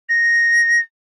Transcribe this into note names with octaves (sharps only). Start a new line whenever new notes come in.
A#6